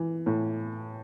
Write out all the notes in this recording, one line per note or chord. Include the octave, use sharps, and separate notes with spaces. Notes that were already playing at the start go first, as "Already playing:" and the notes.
Already playing: E3
A2